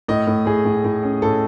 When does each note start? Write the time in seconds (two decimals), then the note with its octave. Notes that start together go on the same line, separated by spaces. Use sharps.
0.08 A2 D#5
0.27 A2
0.46 A2 G#4
0.65 A2
0.84 A2
1.03 C#4
1.22 A2 A4